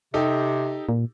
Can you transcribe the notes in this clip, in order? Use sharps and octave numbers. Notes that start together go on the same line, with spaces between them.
C3 D#4 G4 A4
A#2